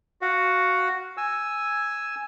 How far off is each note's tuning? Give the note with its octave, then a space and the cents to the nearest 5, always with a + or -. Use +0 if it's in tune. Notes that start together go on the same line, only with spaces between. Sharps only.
F#4 +0 F5 +0
G#5 +0 E6 +0